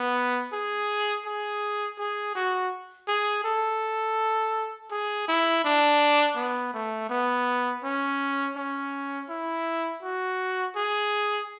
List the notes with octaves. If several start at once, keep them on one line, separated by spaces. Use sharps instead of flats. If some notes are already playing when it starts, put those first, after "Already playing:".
Already playing: B3
G#4
G#4
G#4
F#4
G#4
A4
G#4
E4
D4
B3
A3
B3
C#4
C#4
E4
F#4
G#4